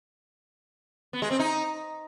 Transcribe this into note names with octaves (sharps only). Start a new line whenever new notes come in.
B3
G#3
C4
D#4